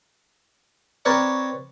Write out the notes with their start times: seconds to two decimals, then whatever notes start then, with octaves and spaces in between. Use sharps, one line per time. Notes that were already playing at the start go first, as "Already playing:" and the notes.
1.05 C4 A#4 B4 C#5 D5 A#5